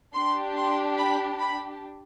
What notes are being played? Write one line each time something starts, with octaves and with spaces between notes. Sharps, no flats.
D4 G4 C6
C6
B5
B5